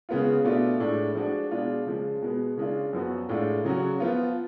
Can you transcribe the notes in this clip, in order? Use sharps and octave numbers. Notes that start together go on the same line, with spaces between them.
C#3 G#3 B3 F4
B2 A3 D4 F4
A2 G#3 D4
F3 G#3 D4 F#4
B2 G#3 D4 F4
C#3 F3 G#3
B2 G#3 B3
C#3 G#3 D4 F4
F#2 F3 B3 F#4
A2 G#3 D4 F4
C#3 F#3 C#4 F#4
F3 B3 F4